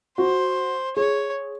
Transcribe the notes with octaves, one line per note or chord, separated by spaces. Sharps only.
F#4 C5
G#4 C#5